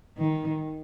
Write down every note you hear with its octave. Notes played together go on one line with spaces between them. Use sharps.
D#3